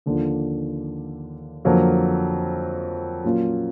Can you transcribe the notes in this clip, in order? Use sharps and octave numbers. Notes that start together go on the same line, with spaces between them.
D#2 D3 F3
F2 D3 F#3 A#3
A#2 F#3 A#3 C#4 F4